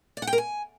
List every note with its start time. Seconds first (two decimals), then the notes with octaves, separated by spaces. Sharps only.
0.17 D5
0.22 F#5
0.27 G5
0.33 A#4
0.38 G#5